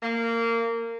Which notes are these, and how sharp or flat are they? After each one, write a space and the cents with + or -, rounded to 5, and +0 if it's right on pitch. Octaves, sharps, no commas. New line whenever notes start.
A#3 -20